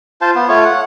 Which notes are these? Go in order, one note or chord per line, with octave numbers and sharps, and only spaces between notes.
F4 C5 A5
B3
A3 F4 C#5
F#5